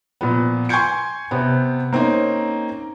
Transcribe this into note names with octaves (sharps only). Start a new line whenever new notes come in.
A#2 F3 B3
G#5 C6 C#6 G6 G#6 C#7
C3 B3
A#3 C4 C#4 D#4